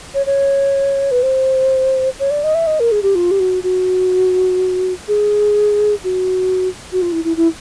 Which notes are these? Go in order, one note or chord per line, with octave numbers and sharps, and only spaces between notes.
C#5
C#5
B4
C5
C#5
D5
D#5
E5
D#5
A#4
G#4
G4
F4
G4
F#4
F#4
G#4
F#4
F#4
F4
E4
E4
E4